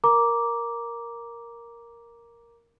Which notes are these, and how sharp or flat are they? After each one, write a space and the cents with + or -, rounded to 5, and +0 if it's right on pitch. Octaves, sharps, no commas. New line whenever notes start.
A#4 +0 A#5 +10 D6 -5